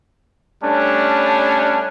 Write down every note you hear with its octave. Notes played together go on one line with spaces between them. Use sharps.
G3 A3 C#4 D4